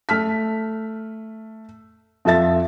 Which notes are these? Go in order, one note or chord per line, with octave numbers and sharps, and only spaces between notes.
A3 F6 B6
F2 F3 A4 E5 A6